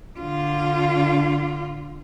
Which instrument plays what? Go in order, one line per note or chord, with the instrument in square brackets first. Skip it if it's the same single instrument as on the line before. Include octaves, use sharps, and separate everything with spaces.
[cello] D3 F4